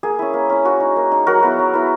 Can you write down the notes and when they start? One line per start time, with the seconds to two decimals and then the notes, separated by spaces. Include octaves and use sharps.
0.03 A#3 G#4
0.19 C#4 E4
0.33 A#3
0.50 C#4 E4
0.65 A#3 F#4
0.80 D#4
0.96 A#3
1.12 D#4
1.27 F#3 F#4 A#4
1.43 B3 E4
1.59 F#3
1.74 B3 E4